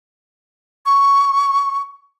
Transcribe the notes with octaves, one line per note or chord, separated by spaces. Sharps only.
C#6